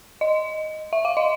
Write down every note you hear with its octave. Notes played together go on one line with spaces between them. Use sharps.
D#5
E5
F5
D#5